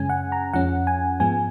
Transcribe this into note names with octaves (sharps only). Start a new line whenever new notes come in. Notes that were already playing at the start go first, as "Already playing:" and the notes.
Already playing: F#2 C#3 G#3 C#4 G#5
F#5
A#5
F2 F3 G#3 C#4 F#5
G#5
G#2 F3 G#3 B3 G#5